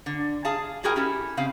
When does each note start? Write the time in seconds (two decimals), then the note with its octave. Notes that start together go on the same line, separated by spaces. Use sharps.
0.06 D3
0.45 G#4 F5 A5
0.83 G3 E4 F#4 G#4 A#4 G5
0.96 C#4 E4 G4 A4
1.37 C#3 C4 F5